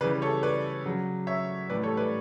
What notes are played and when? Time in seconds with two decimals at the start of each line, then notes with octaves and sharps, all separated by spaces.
0.01 C#3 E3 G3 B4 D5
0.22 A4 C#5
0.43 B4 D5
0.85 C#3 F#3
1.27 C#5 E5
1.69 A2 E3 G3 B4 D5
1.83 A4 C#5
1.97 B4 D5